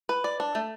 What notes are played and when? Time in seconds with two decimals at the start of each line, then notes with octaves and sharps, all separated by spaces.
0.09 B4
0.24 D5
0.40 D4
0.55 A3